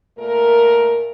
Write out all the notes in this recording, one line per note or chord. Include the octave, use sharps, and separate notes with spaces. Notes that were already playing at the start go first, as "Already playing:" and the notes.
A#2 A3 A#4